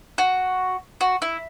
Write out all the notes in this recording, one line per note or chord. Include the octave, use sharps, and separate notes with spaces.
F#4
F#4
E4